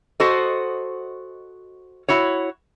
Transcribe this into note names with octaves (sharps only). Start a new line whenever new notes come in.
F#4 A4 C5 D#5
E4 F#4 C#5